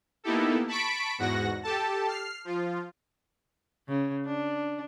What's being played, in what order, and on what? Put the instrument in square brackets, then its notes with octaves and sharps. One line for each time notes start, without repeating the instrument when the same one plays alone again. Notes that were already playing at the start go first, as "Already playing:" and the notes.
[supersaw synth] A#3 B3 D#4 E4 G4 A4
A5 B5 C#6 B6 D7
E2 G#2 F#4 F#5 A#6
G4 A4 A5
F6 C7
F3 F4
[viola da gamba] C#3
D4